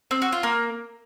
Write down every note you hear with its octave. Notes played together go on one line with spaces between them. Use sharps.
C4
F#4
F4
A#3